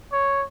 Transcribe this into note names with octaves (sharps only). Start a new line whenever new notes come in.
C#5